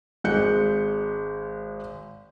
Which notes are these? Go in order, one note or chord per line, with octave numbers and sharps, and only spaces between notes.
G#1 G#3 F#6 G6 C#7